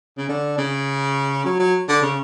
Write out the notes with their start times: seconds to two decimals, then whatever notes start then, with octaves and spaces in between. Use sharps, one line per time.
0.18 C#3
0.29 D3
0.58 C#3
1.45 F#3
1.59 F#3
1.88 D3
2.02 C#3